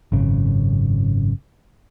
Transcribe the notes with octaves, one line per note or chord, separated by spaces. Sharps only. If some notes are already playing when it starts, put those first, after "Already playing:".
G#1 F#2 C#3